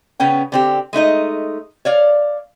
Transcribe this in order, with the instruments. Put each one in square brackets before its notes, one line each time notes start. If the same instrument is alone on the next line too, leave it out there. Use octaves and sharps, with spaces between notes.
[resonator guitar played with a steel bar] C#3 B3 C#4 G5
D3 C4 G4
G#3 A3 D#4 D#5
C#5 D5 F5